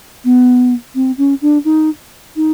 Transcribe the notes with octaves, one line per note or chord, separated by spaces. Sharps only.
B3
C4
C#4
D4
D#4
D#4